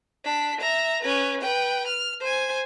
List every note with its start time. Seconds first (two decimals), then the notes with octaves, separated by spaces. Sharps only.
0.24 D4 B6
0.60 E5 A#5
1.02 C#4 B4
1.41 B4 G5
1.87 F6
2.20 C5 G#5